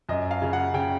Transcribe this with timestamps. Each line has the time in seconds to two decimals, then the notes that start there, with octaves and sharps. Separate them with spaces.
0.09 F#2 D#5
0.31 F5
0.42 C#3
0.53 F#5
0.74 C#3 G5